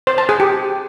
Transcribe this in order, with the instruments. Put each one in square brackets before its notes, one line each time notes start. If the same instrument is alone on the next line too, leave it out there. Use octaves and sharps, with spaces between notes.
[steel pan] C5
A5
G#4
G4